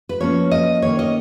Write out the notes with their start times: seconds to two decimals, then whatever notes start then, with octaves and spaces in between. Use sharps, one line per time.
0.09 B4
0.21 F3 A#3 C#4 C#5
0.51 D#5
0.82 D#3 A#3 C#4 C#5
0.99 D#5